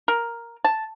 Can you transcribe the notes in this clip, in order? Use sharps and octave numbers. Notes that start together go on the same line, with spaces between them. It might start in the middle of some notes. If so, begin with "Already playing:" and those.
A#4
A5